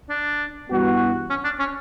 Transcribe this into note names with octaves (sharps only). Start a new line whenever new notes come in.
D4
G2 E3 B3 F#4
C#4
D4
C#4